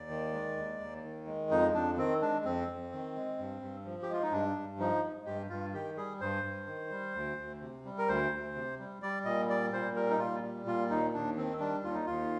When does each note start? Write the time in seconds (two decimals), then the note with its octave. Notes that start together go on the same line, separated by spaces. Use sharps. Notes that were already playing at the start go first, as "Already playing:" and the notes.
Already playing: D#2 D5
0.10 D#3
0.33 G#3
0.57 D#2
0.80 D#2
1.03 D#3
1.26 G#3
1.51 F2 D#4
1.74 F2 D4
1.97 D#3 C4
2.21 G#3 D4
2.45 F2 C4
2.67 F2
2.92 D#3
3.16 G#3
3.39 G2
3.61 G2
3.85 F3
4.02 G4
4.09 G#3 F4
4.23 D#4
4.32 G2 D4
4.57 G2
4.79 F3 D#4
5.03 G#3
5.26 G2 G4
5.50 G2 F4
5.73 D#3 G4
5.97 G3 G#4
6.21 G2 C5
6.43 G2
6.67 D#3
6.90 G3
7.14 D2
7.37 D2
7.61 C3
7.85 G3
7.98 A#4
8.08 D2 C5
8.32 D2
8.55 C3
8.79 G3
9.02 G3 D5
9.25 A#2 D#5
9.49 G3 D5
9.73 A#2 C5
9.96 G3 A#4
10.10 D#4
10.19 A#2 F4
10.43 G3
10.66 A#2 F4
10.90 D#2 D#4
11.13 D#2 D4
11.37 D#3 C4
11.60 G3 D4
11.84 D#2 F4
11.94 D#4
12.06 D#2 F4